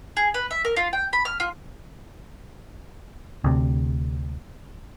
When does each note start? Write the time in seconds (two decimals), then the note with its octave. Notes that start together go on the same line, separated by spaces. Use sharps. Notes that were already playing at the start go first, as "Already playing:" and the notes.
0.17 G#4
0.34 B4
0.51 E5
0.65 A#4
0.76 F4
0.93 G5
1.13 B5
1.25 F6
1.40 F4
3.44 D2 C3